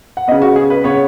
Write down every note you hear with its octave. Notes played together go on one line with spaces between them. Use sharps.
F#5
C#3 B3 D#5
F#4
G#4
B4
C#3 B3 C#5